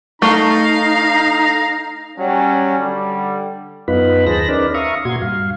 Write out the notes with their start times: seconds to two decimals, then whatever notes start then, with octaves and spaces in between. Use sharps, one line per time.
0.22 A3 D#4 F5 A#5
2.18 F#3 G3 C#4
2.78 D3 G3
3.88 F#2 B3 D#4 F4 B4 B5
4.26 D#2 G#4 C5 A5 B5 A#6
4.49 C#4 D#4 A#4 B4 D5
4.74 E5 F5 A#5 C#6 D#6
5.05 A#2 F#4 C6 G#6
5.22 G2 F5